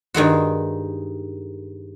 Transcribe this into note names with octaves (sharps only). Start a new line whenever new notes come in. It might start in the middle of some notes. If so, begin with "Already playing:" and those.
G2 D#3 G#3 F#4